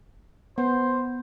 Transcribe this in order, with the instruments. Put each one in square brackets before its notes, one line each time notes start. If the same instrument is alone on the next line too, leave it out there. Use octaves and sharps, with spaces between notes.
[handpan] B3 [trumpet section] C5